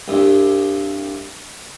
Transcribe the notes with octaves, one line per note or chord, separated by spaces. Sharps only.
C2 G2